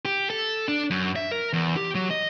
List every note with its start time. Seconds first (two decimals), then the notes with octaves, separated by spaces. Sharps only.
0.05 G4
0.30 A4
0.68 D4
0.90 F#2
1.16 E5
1.31 A#4
1.53 E2
1.77 G4
1.95 F#3
2.11 D#5